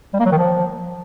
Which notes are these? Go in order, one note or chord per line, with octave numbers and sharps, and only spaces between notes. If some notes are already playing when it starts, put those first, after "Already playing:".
G3
A#3
F#3
D#3
F3